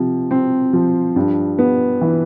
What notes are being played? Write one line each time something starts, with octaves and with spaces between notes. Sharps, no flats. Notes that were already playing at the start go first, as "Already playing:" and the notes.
Already playing: C3 F3
C4
F3
G2
B3
E3